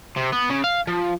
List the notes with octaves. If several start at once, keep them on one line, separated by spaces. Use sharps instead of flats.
C3
B3
C#3
F5
F3